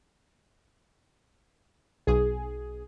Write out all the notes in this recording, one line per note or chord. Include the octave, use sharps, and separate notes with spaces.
B1 G#4